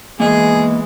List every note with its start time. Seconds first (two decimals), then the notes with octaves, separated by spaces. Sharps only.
0.20 E3 G#3 A#3 B3 G#4 D#5